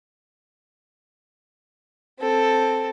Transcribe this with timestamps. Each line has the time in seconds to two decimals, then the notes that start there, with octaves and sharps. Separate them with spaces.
2.20 C4 A4